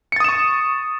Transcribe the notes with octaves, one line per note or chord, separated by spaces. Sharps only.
C#6 D#6 A6 C#7 E7